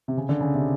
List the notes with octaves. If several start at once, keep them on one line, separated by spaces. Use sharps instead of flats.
C3
C#3
D3
C#3
C3